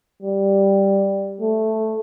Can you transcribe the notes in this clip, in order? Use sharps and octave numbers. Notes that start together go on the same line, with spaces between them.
G3
A3